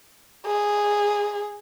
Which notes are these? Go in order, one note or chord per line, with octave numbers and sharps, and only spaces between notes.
G#4